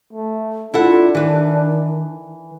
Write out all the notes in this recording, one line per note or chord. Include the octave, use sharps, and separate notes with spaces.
A3
D4 E4 F4 A4 F#5
D#3 E3 B4